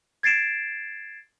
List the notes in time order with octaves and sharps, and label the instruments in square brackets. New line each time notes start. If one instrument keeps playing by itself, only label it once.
[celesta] G#6 A6 C7 D7 E7